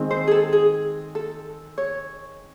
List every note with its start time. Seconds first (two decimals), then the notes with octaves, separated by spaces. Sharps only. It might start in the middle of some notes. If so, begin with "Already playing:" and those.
Already playing: D#3 G#3 C4
0.11 C5
0.28 G#4
0.31 A4
0.53 G#4
1.15 A4
1.78 C#5